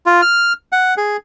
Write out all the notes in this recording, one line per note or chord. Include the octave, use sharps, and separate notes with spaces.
F4
F6
F#5
G#4